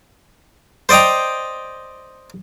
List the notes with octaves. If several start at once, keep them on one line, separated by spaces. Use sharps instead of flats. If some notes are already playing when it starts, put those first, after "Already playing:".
C5 D5 D#5 G5 A#5